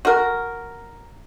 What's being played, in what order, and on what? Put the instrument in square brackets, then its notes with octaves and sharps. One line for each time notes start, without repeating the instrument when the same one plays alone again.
[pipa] F#4 A#4